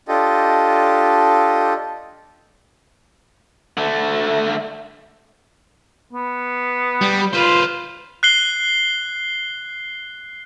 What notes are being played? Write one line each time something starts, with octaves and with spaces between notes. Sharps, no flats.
D4 F4 G4 A4 D#5
D3 A3
B3
G3
F4 B4 C5
F#6 C7 G7